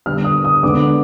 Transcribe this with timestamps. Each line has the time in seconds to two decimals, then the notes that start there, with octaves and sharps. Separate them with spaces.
0.06 D3 G3 B3 F6
0.24 D#6
0.45 D#6
0.63 D3 G#3 B3 D6